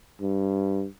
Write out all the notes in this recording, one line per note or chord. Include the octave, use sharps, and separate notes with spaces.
G2